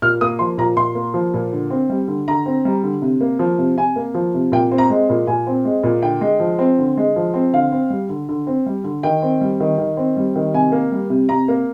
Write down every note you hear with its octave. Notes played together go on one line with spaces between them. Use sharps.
A#2 F6
A#3 D#6
F3 C6
A#2 A#5
A#2 C6
A#3
F3
A#2
D3
C4
G3
D3
D3 A#5
C4
G3
D3
C3
A#3
F3
C3
C3 G#5
A#3
F3
C3
A#2 G5
C4
A#5
G#3
A#2
A#2 G#5
C4
G#3
A#2
D3 G5
G#3
F3
C4
D3
G#3
F3
C4
D3 F5
C4
G3
D3
D3
C4
G3
D3
D#3 G5
C4
G3
D#3
D#3
C4
G3
D#3
C3 G#5
A#3
G3
C3
C3 A#5
A#3